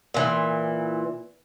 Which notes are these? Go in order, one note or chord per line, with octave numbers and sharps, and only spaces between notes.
A#2 E3